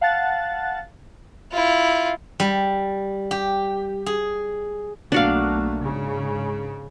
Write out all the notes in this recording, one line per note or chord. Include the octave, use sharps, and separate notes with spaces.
F5 F#5 A5 F#6 A6
E4 F4
G3
G4
G#4
B1 A3 A#3 D4 F#4 F5
G#2 C#3